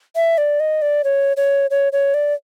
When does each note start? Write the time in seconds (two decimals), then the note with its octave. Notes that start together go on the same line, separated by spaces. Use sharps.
0.16 E5
0.38 D5
0.60 D#5
0.82 D5
1.04 C#5
1.37 C#5
1.71 C#5
1.93 C#5
2.14 D5